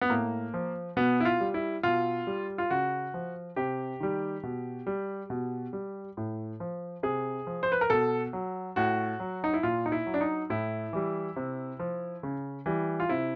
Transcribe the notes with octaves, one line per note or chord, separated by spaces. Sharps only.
B3
A2 A#3
F3
B2 B3
E4
F4
G3
E4
B2 F4
G3
F4
C#3 F#4
F3
C3 G4
D#3 G3
B2
G3
B2
G3
A2
F3
C3 G#4
F3
C5
B4
A#4
B2 A4
F#3
A2 F#4
F#3
D#4
E4
A#2 F4
D#4
E4
F#3
D4
D#4
A2 E4
E3 G3
C3
F3
C#3
E3 G3
F4
C3 E4